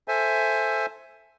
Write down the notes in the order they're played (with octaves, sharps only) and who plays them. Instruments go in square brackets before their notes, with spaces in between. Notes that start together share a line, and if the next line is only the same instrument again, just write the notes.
[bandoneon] A4 C5 E5 G#5